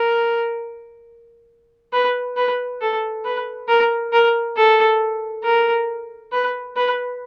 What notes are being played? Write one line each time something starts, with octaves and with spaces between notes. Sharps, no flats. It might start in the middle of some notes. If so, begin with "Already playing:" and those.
Already playing: A#4
B4
B4
A4
B4
A#4
A#4
A4
A#4
B4
B4